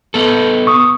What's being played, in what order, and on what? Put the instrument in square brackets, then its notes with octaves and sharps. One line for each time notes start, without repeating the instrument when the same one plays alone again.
[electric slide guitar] B3 A4
[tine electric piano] C#6 D#6